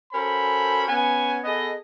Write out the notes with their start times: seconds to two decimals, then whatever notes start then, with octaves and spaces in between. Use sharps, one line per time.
0.13 C#4 F#4 A4 A#4 C5 B5
0.89 B3 C#4 G#5
1.44 B3 G#4 A4 D#5